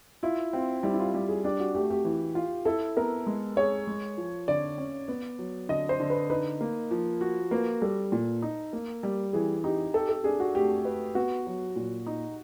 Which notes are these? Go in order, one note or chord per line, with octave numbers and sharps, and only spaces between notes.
E4 F4
C4 F4
G3 E4
E4
F4
G3 G4
G#4
D4 G4
F#4
A3 G4
G4
E3
F4
E4 A4
B3 A#4
G#3
G#4 C#5
G#3
F3
D3 D5
C#4
B3
F#3
D3 D#5
C5
D3
B4
D#4 B4
A#3
F3
F#4
A#3 B4
G3 A4
A#2
D#4
A#3
G3
E3 G#4
D#4 G4
G4 A4
A4
D4 G#4
F#4
A3 G4
B4
B3 F#4
F#3
A#2
D#4